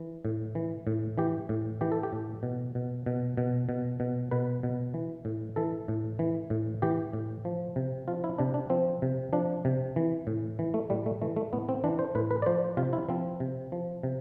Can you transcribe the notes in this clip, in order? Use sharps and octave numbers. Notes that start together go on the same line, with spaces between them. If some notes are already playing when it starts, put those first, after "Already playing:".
Already playing: E3
A2
E3
A2
E3 G4
A2
E3 G4
A4
G4
A2
B2
B2
B2
B2
B2
B2
B2 B4
B2
E3
A2
E3 A4
A2
E3
A2
E3 G4
A2
F3
C3
F3 F4
E4
C3 D4
D4
F3 C4
C3
F3 D4
C3
E3
A2
E3
A3
A2 G3
A3
E3 A3
A3
A2 B3
C4
E3 D4
C5
A2 B4
B4
D5
F3 C5
C3 F4
E4
F3 C4
C3
F3
C3